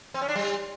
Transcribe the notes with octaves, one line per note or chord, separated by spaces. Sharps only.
C4
C#4
D4
G3